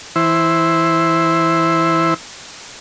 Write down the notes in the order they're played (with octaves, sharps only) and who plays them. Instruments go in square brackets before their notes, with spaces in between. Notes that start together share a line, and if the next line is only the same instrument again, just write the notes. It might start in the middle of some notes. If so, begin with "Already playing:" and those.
[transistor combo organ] E3 E4 C5